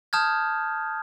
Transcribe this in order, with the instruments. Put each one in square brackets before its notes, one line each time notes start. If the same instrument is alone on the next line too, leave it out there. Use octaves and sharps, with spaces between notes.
[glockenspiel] A5 D#6 F6 G6 G#6